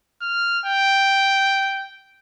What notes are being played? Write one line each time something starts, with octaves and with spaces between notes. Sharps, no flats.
F6
G5